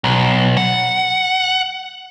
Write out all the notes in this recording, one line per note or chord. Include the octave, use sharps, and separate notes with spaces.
B1
F#5